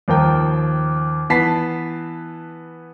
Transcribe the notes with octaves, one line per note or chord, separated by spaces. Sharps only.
D#2 F3 A#4 G5
E3 B3 A5 B6 C7